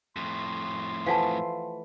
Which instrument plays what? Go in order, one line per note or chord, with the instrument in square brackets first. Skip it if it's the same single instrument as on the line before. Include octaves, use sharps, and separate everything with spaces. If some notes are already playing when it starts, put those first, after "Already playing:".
[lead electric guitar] F2 A2 [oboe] C6
[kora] E3 F3 A3 [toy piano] F5 F#5 A5